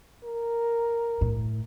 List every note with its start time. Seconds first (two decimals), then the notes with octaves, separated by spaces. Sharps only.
0.24 A#4
1.21 A2